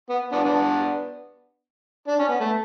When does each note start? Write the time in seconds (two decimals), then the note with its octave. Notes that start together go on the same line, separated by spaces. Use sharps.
0.10 B3
0.32 B3 D4
0.44 B3 D4
2.08 D4
2.19 C#4
2.29 B3
2.40 A3